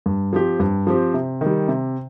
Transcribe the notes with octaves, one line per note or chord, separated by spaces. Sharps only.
G2
F3 C4 G4
G2
F3 C4 G4
C3
D#3 G3
C3